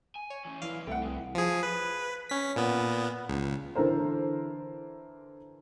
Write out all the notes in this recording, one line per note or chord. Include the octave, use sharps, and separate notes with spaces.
G#5
C#5
E3 C#4
B2 E3 D5 F5
C2 A3 F#5 G5
E2 E3 G#3
F3 G#4
B4
C#4 B6
A#2 B3
C#2
D3 E3 A4 A#4 C5